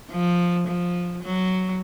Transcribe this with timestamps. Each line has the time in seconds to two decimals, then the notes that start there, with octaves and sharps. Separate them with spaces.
0.11 F3
0.67 F3
1.23 F#3